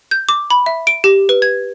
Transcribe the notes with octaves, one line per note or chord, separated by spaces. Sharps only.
G6
D6
B5
E5
D7
G4
B4
G#6